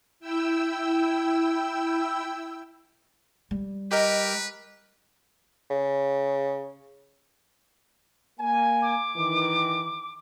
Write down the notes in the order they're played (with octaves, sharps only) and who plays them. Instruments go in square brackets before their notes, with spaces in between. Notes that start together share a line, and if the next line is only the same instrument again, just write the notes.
[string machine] E4 G5 E6
[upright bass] G3
[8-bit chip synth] G4 A#4 [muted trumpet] B4 [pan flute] D#5
[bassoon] C#3
[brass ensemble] A#3 G#5
[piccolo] D6
[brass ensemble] D#3 E3